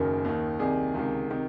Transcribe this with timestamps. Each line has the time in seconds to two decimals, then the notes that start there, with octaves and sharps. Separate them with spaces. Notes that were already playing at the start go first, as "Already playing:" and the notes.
Already playing: F#1 F#2 D#3 A#4
0.24 D#2 D#3
0.59 C2 C3 D#3 G#4
0.94 C#2 C3 D#3
1.30 C3 D#3